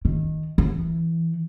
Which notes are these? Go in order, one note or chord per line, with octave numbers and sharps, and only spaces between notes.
D#3
E3